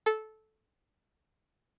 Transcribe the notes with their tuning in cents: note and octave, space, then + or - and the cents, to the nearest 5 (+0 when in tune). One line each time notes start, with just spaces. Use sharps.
A4 -15